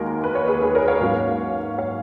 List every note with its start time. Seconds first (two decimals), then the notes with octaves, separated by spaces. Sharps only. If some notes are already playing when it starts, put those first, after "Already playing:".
Already playing: D#2 D#3 G#3 F#4 A#4
0.24 B4
0.35 C#5
0.48 G#4 B4
0.62 G#4 B4
0.75 A#4 C#5
0.88 C#5 F5
1.01 G#2 F#3 A#3 C#4
1.78 C#5 F5